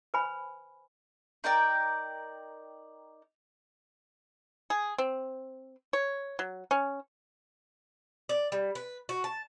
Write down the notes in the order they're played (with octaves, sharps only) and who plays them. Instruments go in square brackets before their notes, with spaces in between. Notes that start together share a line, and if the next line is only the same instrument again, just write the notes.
[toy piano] B4 C5 G#5 B5
[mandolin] D#4 A#4 D5 G5
[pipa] G#4
C4
C#5
F#3
C#4
[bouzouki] D5
G3
B4
F#4
A5